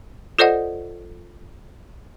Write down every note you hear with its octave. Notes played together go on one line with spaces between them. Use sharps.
F4 A4 C5 D5 D#5 F#5